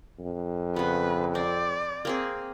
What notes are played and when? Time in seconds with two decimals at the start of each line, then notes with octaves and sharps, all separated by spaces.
0.19 F2
0.76 C#3 B3 B4
1.35 C4 D5
2.05 A#3 C4 G#4